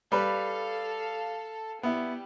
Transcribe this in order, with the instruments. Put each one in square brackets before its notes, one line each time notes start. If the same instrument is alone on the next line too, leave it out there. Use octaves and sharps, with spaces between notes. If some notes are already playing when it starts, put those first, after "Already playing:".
[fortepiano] G3 B4 [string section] A4 F5
[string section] G3 [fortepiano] B3 E4